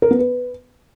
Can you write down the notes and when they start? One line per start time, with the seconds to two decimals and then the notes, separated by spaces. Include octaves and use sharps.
0.02 A#4
0.11 B3
0.19 B4